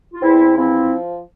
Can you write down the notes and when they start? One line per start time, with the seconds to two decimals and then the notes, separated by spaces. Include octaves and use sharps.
0.14 F4
0.23 E2 C4 E4
0.57 F3 C4 E4